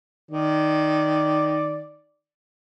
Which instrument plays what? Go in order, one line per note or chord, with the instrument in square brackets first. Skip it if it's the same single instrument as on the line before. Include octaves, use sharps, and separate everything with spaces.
[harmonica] D#3 D5